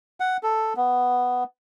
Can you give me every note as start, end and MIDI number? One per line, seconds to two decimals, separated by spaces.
0.20 0.37 78
0.43 0.73 69
0.77 1.44 59